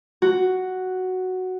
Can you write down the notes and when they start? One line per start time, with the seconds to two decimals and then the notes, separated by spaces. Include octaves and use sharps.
0.22 F#4